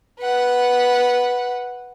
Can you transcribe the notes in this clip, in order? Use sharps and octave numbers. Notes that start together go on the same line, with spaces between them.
B4 F#5